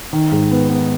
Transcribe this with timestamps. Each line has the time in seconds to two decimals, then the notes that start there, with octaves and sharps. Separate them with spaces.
0.13 D#3
0.32 G#2
0.51 B3
0.69 B3